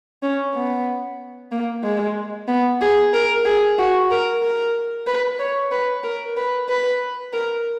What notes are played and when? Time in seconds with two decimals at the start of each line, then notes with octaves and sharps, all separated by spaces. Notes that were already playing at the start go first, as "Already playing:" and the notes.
0.23 C#4
0.54 B3
1.52 A#3
1.83 G#3
2.48 B3
2.81 G#4
3.14 A#4
3.45 G#4
3.78 F#4
4.11 A#4
4.43 A#4
5.07 B4
5.39 C#5
5.72 B4
6.03 A#4
6.37 B4
6.69 B4
7.33 A#4